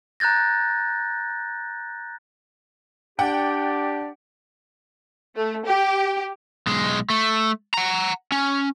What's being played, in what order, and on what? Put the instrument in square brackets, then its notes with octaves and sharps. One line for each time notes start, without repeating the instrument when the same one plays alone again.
[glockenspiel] A#5 F#6 G6 A6 A#6
[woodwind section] D4 G4 D5 [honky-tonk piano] F#5 G5
[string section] A3
G4
[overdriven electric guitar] B1 G#3
A3
F#5 A#5
C#4